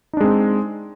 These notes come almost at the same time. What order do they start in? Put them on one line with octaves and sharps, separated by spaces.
D#4 D4 G#3 C4